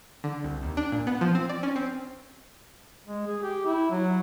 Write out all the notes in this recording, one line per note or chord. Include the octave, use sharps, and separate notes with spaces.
D3
C2
D#2
D4
A#2
B3
F3
C4
D5
C#4
C4
G#3
G#4
G4
E4
F#3